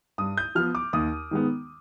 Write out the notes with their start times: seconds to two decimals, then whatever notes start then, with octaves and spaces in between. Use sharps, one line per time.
0.18 G2 D#6
0.37 G6
0.55 F3 B3 F6
0.75 D6
0.93 D#2 D#6
1.31 D#3 G#3 B3